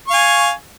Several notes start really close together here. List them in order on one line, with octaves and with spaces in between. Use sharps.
C#6 F5 G#5